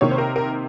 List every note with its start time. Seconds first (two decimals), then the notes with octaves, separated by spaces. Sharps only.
0.01 C3 D#3 A#3 C#5
0.11 C5
0.18 A#4
0.36 A#4